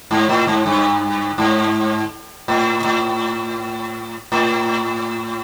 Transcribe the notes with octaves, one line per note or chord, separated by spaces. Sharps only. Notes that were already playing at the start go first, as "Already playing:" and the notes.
G#2
A2
G#2
G2
G#2
A2
A2
A2